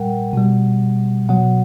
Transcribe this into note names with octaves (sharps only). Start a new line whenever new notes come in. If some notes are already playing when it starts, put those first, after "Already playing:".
Already playing: A#2 G3 A#4 F#5 G5
B2 G3
B2 F#3 F#5